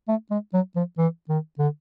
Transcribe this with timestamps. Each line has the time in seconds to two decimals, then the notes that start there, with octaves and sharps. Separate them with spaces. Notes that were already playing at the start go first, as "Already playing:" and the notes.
0.08 A3
0.31 G#3
0.53 F#3
0.76 F3
0.98 E3
1.29 D#3
1.59 D3